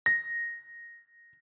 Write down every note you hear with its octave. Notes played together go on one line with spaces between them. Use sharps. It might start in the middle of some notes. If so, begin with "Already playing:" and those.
A#6